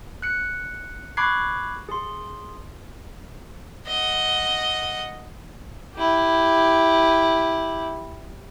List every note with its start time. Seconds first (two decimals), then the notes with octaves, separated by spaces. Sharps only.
0.22 F#6 C#7
1.17 B5 C#6 D6 F#6 G#6 C7
1.89 G#4 C6
3.87 D#5 F#5
5.95 E4 G4